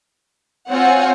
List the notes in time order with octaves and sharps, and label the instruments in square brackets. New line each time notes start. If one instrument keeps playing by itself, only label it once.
[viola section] C4 F4 [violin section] C#5 F#5 G#5